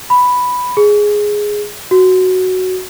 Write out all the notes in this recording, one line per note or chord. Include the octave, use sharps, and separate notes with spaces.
B5
G#4
F#4